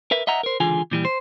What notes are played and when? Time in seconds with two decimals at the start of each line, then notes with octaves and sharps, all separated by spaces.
0.11 A#4 B4 E5
0.27 D#5 E5 F#5 A#5
0.43 A#4 C5
0.60 C#2 D3 E3 F4 G#4 G#5
0.91 A#2 E3 G3
1.05 C5